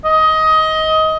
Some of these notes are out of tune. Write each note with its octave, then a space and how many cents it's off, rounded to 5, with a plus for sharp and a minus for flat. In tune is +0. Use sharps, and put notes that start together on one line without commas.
D#5 +20